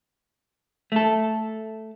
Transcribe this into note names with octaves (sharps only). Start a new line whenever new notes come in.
A3 A4